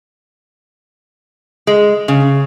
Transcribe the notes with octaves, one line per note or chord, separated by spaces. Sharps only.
G#3
C#3